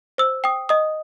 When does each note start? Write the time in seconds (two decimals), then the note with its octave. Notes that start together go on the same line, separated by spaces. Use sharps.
0.18 C5 E6
0.44 G5 D#6
0.69 D#5 D#6